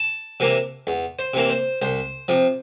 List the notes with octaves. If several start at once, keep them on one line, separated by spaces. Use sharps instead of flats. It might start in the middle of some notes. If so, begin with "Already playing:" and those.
Already playing: A5
C3 E3 A#3
E2
C5
C3 E3 A#3
C5
C2 C5
C3 F3